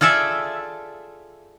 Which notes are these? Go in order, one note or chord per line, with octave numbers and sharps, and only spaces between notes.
F4 G#4 A4 D5 E5